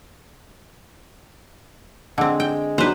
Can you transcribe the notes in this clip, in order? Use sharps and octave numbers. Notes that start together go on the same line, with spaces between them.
D3 G#3 C4
G5
F#3 D4 B4 C5